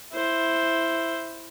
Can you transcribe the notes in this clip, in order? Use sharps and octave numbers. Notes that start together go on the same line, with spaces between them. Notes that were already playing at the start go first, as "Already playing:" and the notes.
E4 C5